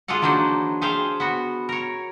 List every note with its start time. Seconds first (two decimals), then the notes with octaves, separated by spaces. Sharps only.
0.08 F4 G#4 A4 D5 F#5
0.22 E3 F#3 A#3 D4 D#4 C5
0.81 G#4 A4 C5 E5 F5 G5
1.20 B3 F#4
1.69 A#4 C#5